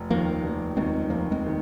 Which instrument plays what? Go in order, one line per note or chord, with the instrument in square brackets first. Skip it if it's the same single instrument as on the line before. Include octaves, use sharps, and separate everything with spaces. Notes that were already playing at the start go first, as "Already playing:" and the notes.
Already playing: [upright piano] F1
[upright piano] D#2 D#3 [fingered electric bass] F3 A#3
[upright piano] F1
[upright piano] D#2 D#3 [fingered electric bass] G#3 C4
[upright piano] F1 [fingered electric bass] F3 A#3
[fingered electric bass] G#3 C4
[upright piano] D#3